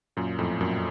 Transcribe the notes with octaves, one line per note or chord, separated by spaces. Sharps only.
F#2 A#2
F2 A2
F#2 A#2